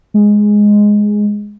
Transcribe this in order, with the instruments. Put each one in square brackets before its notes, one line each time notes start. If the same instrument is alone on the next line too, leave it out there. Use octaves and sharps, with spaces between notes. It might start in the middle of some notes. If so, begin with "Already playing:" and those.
[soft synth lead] G#3